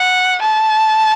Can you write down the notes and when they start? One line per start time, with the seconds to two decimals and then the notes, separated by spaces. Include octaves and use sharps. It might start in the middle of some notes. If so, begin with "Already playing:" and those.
Already playing: F#5
0.42 A5